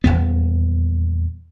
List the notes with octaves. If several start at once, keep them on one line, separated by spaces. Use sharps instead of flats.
D#1 G#1 E2 B3